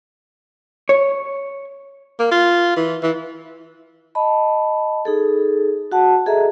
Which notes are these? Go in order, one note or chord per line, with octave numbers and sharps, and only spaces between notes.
C#5
A#3
F4
E3
E3
D#5 A5 B5
D#4 G#4 A4
F#4 F#5 A5
G#4 A4 D#5 E5 A#5